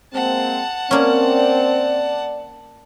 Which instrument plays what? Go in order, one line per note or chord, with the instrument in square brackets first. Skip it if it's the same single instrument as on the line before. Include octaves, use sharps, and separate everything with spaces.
[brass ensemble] G#3 A#3 C4 [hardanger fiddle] F#5 A5
[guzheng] A#3 C#4 [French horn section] C4 [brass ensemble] D5